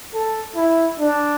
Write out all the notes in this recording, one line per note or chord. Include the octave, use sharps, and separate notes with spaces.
A4
E4
D4